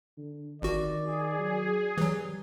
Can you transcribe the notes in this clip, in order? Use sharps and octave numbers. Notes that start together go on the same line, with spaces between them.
D3
G#1 D#3 F#4 D5
G#4
F#3
E3 F#3 G3